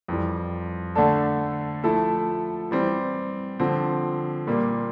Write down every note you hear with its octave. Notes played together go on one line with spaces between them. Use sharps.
F2 E3 G3
D3 A3 D4 A4
F3 A3 E4 A4
E3 G3 C4
D3 F3 C4
A#2 G3 A#3